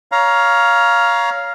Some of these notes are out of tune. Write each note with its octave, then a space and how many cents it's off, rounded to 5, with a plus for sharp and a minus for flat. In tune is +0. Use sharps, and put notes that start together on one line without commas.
C#5 +15 F5 +0 A#5 +20